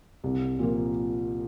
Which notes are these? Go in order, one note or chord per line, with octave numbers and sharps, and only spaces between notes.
C2
A#2 F3 A#3